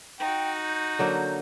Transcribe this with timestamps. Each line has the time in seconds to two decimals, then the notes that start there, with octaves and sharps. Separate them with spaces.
0.19 D#4 F#4 G5
0.65 G6
0.99 D3 F#3 A#3